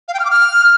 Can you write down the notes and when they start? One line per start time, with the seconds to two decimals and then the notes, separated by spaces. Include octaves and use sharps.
0.08 F5
0.14 G5
0.19 F6
0.25 D6
0.31 F6